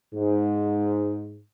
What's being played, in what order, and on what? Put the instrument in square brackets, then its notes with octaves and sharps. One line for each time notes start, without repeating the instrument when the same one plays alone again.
[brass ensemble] G#2